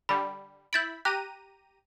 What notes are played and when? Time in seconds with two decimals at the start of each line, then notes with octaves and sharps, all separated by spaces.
0.09 D3 G3 B5
0.73 E4 B5 G6 A6 D7
1.05 G4 A#5 F#6 D#7